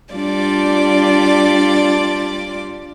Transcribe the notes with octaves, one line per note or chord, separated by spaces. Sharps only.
G3 D4 F4 D5 D6